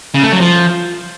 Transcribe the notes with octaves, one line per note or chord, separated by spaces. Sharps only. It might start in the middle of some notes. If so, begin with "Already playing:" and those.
C#3
A3
F#3
F3